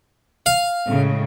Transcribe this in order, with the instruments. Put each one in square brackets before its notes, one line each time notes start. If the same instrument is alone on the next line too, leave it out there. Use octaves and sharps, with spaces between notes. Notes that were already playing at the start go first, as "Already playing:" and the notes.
[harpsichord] F5
[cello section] A2 C#3 G#3